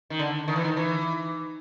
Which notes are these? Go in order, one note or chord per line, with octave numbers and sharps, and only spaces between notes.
D#3
D3
D#3
E3
D#3
E3